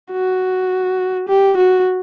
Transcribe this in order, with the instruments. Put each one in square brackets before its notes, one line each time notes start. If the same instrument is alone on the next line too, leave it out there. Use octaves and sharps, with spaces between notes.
[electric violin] F#4
G4
F#4